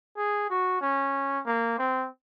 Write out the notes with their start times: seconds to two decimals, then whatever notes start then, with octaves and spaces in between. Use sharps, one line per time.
0.17 G#4
0.50 F#4
0.81 C#4
1.46 A#3
1.78 C4